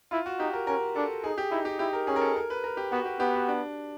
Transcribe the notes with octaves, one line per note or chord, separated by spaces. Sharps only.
E4 F4
F#4
D#4 G4
A#4
C#4 A#4
D4 A4
D#4 G#4
G4
D#4 E4
G4
E4 G4
A#4
C#4 G#4
A#4
A4
A#4
B4
A#4
G4
B3 F#4
G4
B3 G4
F#4
D4